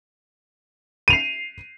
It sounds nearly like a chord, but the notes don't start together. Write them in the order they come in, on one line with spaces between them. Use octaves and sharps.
D#7 F7 C7